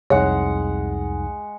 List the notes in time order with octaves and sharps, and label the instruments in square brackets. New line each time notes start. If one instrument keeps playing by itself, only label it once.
[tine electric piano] C2 F2 D#4 [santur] G#3 F#5 [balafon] C#5